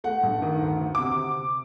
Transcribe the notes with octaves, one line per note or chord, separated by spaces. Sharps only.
A3 F#5
G2
D#3
D2
D2
D6
C3